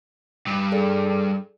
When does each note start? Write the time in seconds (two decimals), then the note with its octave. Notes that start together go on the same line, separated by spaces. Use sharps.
0.47 G2
0.72 G#4 A4 D5